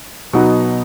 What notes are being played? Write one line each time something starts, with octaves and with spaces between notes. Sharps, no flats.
B2 F#3 B3 D#4